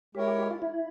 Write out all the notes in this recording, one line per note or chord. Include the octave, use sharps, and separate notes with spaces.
G#3 E4 G4 A#4 C#5
G4
G4
F4
E4